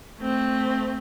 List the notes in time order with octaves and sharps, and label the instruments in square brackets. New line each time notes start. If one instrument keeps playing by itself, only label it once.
[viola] A3 C4